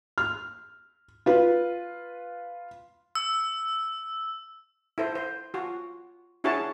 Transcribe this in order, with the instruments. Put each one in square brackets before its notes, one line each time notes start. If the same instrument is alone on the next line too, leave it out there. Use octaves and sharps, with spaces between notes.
[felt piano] F6
F4 B4
[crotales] E6
[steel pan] E4 A4 C5
C5
F4 F#4
D4 E4 F#4 G#4 C#5 A5